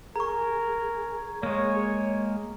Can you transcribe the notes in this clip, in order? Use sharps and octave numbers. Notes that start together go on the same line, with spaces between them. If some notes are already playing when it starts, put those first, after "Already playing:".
G#4 A#4 A#5 C#6
G#3 A#3 C#5